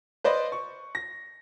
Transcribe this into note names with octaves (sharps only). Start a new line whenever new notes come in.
B4 C5 D5 D#5 B5
C#6
A#6